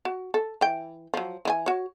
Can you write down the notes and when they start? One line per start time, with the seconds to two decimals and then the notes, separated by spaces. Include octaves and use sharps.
0.05 F#4
0.34 A4
0.61 E3 G5
1.14 F3 F#3
1.45 E3 E4 G#5
1.66 F#4 C#5